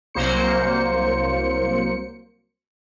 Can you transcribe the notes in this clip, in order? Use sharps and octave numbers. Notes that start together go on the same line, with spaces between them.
C2 F#3 A#3 C5 C#7